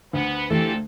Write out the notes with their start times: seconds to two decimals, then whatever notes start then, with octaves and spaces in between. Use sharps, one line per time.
0.13 D2 B3
0.50 A#2 E3 A3 C4 G4 A4